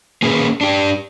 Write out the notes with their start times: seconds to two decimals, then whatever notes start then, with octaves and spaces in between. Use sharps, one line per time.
0.22 A#3 C#4 G#4 A#4 B4
0.61 D4 G4